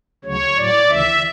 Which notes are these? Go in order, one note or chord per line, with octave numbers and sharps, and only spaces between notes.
D2 C#3 F#3 C#5
A2 F#3 D5
D2 C#3 E3 E5